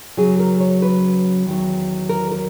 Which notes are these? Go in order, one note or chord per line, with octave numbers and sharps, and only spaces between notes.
F#2 C#3 F#3 G#4
A#4
C#5
B4
E2 D#3 F#3
A#4
A#4